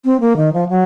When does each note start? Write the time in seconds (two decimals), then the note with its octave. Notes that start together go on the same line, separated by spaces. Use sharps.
0.05 C4
0.20 A#3
0.37 D#3
0.53 F3
0.69 F#3